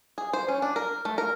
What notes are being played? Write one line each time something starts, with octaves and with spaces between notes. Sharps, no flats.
G#4
C5
C#4
D4
A#4
A3
A#4